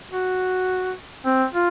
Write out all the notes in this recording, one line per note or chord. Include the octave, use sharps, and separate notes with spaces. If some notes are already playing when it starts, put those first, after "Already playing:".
F#4
C4
F4